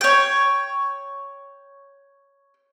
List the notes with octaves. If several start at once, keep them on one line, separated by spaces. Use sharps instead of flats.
C#5 G5